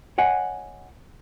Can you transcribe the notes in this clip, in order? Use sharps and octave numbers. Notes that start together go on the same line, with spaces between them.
C#5 D#5 F#5 G#5